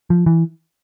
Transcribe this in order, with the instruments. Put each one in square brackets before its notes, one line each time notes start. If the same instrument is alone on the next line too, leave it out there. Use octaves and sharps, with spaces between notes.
[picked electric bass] F3
E3